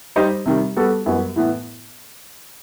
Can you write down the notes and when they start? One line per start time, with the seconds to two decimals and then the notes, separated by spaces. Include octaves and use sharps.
0.16 G3 D#4 G4 C5 D#5
0.45 C3 D#3 G3
0.76 G3 B3 F#4 A4
1.06 F#2 E3 G3 B3 F#4
1.36 A2 E3 B3